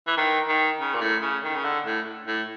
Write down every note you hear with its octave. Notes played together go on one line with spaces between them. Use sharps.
E3
D#3
D#3
C#3
A#2
A2
C#3
D#3
C#3
D3
A2
A2